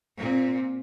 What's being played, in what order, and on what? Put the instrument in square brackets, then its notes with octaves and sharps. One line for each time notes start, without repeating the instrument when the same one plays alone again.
[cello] A#2 C4